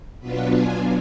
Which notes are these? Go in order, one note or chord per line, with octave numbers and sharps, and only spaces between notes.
B2 F#3 B3 D4 F4 B4
G#5